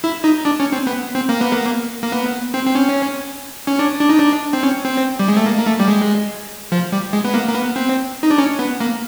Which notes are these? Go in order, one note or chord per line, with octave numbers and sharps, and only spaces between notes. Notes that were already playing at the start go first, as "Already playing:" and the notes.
E4
D#4
D4
C#4
C4
B3
C4
A#3
B3
A#3
A#3
B3
C4
C4
C#4
C#4
D4
D4
D#4
D4
C4
C#4
C4
G3
G#3
A3
A#3
A#3
A3
G3
G#3
F3
G3
G#3
B3
A#3
A#3
B3
C4
D#4
D4
C#4
B3
A#3